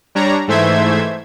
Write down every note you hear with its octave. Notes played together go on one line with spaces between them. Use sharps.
G3 D4 C#5 A#5
G#2 E3 A3 C5 E5 G#6